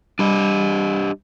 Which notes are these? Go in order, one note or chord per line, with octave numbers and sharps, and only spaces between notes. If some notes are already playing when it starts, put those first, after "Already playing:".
G3 D4 G4 D#5 B5